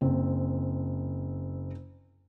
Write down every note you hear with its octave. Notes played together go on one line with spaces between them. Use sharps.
F#1 C4